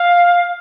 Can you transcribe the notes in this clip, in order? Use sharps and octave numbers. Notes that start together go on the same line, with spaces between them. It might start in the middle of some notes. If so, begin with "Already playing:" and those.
Already playing: F5